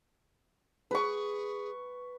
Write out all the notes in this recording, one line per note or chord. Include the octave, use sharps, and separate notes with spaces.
G#4 B4 C#6